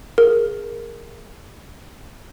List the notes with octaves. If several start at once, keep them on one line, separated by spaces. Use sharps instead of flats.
G#4 A#4